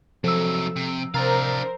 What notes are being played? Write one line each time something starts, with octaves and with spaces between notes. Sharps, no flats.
C3 F3 F#3 A4 E6
C3
C3 D4 A#4 C5 F5 A#5 A6